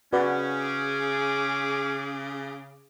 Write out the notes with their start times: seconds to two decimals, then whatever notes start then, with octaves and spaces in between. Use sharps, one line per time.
0.13 C#3 C#4 F#4 B4 D5
0.61 G#4 D6